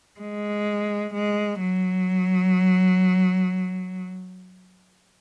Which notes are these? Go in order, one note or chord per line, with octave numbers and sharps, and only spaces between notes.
G#3
G#3
F#3